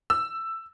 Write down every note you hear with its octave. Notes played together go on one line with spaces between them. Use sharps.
E6